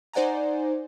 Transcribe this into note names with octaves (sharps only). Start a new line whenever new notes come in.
D#4 C5 D5 F#5 G#5 A#5